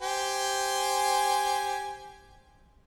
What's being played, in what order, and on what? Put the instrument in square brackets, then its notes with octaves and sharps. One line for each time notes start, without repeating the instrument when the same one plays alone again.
[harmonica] G4 C5 G#5